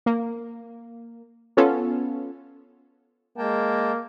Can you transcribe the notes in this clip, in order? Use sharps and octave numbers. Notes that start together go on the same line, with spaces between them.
A#3
B3 C#4 F4 A4
G#3 A#3 G5 A5